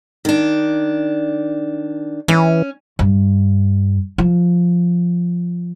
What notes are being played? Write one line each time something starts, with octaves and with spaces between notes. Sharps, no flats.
D#3 D4
E3 C#4
G2
F3